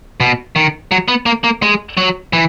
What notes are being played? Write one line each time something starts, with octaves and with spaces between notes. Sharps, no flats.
B2
D#3
F#3
B3
A#3
A#3
G#3
F#3
E3